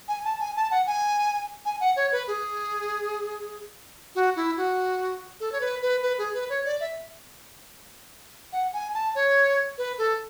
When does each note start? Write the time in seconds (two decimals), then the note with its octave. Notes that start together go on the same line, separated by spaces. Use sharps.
0.08 G#5
0.24 A5
0.40 G#5
0.56 A5
0.71 F#5
0.87 G#5
1.65 G#5
1.80 F#5
1.96 C#5
2.12 B4
2.27 G#4
4.15 F#4
4.36 E4
4.57 F#4
5.40 A4
5.52 C#5
5.61 B4
5.82 B4
6.02 B4
6.18 G#4
6.34 B4
6.50 C#5
6.65 D5
6.80 E5
8.53 F#5
8.73 G#5
8.94 A5
9.15 C#5
9.78 B4
9.98 A4